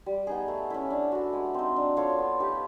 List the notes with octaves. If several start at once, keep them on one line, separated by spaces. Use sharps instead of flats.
G3
B3 D#4 G#4
A3
C#4 E4
D4
F#4 A4
G#3
C4 D#4
D4
F4 A4 C#5
B3
D#4 G4 B4